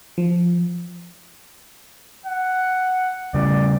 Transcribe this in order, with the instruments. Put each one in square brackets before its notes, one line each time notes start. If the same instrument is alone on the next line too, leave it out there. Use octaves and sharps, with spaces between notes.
[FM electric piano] F3
[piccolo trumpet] F#5
[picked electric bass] C#3 G3 [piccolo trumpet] D5